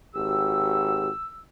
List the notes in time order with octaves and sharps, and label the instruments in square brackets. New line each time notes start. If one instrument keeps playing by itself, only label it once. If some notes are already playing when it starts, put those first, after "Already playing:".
[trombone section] G#1 F#4 G4 [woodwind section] E6